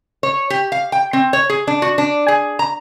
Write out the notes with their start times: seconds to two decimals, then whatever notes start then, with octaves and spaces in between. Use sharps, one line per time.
0.23 C#5
0.50 G4
0.72 F5
0.92 G5
1.13 C4
1.33 C#5
1.50 G#4
1.67 D4
1.82 F#4
1.98 D4
2.28 G#4
2.59 A#5